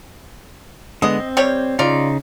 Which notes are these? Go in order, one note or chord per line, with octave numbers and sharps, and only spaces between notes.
D3 G#3 B3 D#5
C4
G3 G4 C#5
C#3 D#4 F4 D5